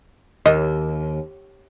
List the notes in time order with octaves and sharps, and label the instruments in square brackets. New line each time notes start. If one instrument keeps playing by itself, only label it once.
[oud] D#2 [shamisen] D#5